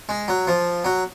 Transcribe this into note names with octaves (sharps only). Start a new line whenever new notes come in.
G#3
F#3
F3
F#3